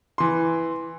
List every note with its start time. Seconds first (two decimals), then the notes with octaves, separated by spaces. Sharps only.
0.18 E3 C6